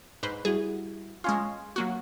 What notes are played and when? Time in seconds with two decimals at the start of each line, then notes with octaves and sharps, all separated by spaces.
0.23 G#2 B4 C5
0.45 G3 E4 F#4 G#4
1.24 G#3 C#4 F4 F5 G#5 C6
1.76 F#3 A#3 F#4